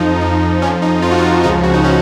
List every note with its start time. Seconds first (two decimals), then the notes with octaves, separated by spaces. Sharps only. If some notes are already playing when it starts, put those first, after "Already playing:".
Already playing: F2 F3 D#4
0.21 F2 F3
0.62 F2 F3 C#4
0.82 D#4
1.02 F2 F3 F4
1.11 F#4
1.18 F4
1.43 C#2 C#3 F3 D#4
1.63 F#4
1.74 D#4
1.84 C#3 C#4